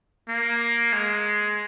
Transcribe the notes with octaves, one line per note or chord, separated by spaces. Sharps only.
A#3
G#3